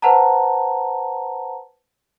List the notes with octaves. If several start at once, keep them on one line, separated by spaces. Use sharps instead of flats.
B4 C5 F#5 A5 A#5